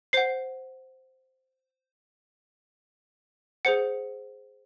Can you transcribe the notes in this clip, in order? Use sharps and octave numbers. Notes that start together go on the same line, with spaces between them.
C5 F#5 C7
G#4 C5 F#5 C#7